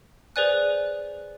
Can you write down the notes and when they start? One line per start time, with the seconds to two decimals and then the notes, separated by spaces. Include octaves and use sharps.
0.36 G#4 B4 C5 D5 G#5 F#6